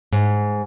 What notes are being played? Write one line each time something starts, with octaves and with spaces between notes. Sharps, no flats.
G#2